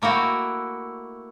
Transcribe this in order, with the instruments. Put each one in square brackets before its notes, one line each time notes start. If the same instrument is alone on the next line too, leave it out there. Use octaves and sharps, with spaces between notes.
[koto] A3 A#3 E4 F#4 G5